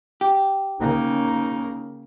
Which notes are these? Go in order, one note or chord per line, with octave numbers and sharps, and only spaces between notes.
G4
C#3 A#3 D#4